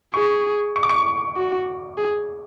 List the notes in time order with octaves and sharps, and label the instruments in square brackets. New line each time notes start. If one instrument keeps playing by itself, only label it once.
[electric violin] G#4 [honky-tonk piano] C#6
[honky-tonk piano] C#6
D6
C#6
[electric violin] F#4
G#4